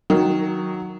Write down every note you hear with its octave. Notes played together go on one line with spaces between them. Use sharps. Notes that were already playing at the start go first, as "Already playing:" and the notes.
D#3 F#3